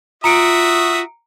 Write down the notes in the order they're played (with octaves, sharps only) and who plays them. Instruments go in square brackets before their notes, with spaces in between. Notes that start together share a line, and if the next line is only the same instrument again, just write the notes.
[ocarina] F4 [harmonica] F#4 E5 D#6 [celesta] A#5 C#7 D7